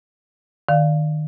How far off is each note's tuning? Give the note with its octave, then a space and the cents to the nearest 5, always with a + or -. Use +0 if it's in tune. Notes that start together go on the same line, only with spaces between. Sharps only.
D#3 -30 D5 +5 F5 +0